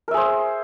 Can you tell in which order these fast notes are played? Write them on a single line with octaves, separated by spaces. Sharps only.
A#4 E5 G#4 C5